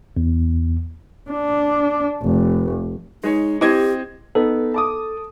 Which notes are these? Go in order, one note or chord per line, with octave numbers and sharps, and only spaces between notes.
E2
D4
F1
G#3 D#4 C#5
C4 E4 G4 D#5 G#6
B3 D#4 A4
A5 D6 D#6